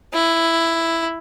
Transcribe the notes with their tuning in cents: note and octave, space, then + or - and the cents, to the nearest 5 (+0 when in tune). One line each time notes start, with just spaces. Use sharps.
E4 +5